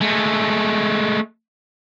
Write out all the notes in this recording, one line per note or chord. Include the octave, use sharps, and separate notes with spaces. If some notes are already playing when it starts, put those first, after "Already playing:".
G#3 A3